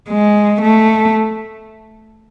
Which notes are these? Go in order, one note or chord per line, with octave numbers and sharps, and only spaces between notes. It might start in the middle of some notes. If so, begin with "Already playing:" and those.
G#3
A3